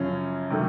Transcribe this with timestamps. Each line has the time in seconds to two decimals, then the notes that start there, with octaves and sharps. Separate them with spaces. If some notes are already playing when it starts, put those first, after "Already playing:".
Already playing: F#2 C#3 F3 C#4
0.50 C3 D#3 F#3 A3